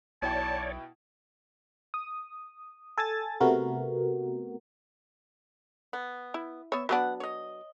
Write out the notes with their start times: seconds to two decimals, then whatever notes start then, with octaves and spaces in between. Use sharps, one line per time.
0.22 B1 B2 E4 C#5 D5 G5 A5
1.94 D#6
2.98 A4 G#5 A5 A6
3.40 C3 A3 B3 F#4 A#4
5.93 B3
6.34 E4
6.72 B3 C#5 E5
6.89 F#3 B3 D4 B4 F#5
7.20 C#5 D#5